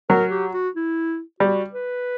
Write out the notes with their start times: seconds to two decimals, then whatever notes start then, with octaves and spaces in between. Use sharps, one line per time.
0.10 F#3 A#4
0.31 G4
0.54 F#4
0.75 E4
1.40 G3 F#4
1.73 B4